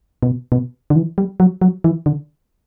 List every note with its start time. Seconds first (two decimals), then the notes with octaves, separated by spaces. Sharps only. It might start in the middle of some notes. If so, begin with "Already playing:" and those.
0.23 B2
0.52 B2
0.90 D3
0.96 E3
1.18 G3
1.40 F#3
1.62 F#3
1.84 E3
2.06 D3